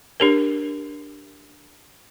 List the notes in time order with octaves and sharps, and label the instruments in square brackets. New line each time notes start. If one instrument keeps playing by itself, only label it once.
[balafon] D4 G4 A#4